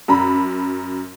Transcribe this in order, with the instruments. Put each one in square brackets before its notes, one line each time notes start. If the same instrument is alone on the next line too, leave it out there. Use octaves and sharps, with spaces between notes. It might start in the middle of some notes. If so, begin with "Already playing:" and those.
[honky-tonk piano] F#2 A#5 B5